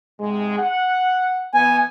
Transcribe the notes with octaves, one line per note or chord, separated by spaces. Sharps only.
G#2 C3 G#3
F#5
E3 B3 G#5